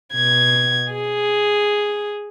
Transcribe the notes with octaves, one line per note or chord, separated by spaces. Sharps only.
B2 G#6
G#4